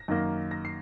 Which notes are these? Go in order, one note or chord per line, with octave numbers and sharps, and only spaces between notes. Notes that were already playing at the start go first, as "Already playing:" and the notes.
Already playing: A#6
F#2 D#3 A#3
A#6
C7